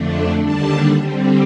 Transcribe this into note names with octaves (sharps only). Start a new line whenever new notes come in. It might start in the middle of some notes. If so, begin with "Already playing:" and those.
Already playing: F2 D3 A3 D4
D#2 D3 G3 D4 A5
D3 G3 C4